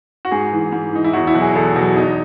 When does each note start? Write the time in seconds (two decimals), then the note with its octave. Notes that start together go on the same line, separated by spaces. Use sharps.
0.25 F#4
0.31 G#2 G#4
0.53 E3
0.72 G#2
0.93 E3 D#4
1.04 E4
1.13 E2 F#4
1.27 E4
1.35 B2 F#3
1.41 G#4
1.55 E2 A4
1.76 B2 F#3
1.96 E2 D#4